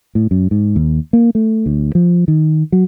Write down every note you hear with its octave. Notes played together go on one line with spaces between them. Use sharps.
A2
F#2
G#2
D#2
A#3
A3
D2
F3
D#3
F#3